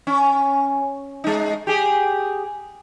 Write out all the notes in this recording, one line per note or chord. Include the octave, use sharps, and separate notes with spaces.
C#4
G#3 D#4
G4 G#4